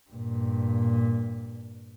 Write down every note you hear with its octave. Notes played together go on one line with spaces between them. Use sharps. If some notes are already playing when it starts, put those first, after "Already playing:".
G2 A#2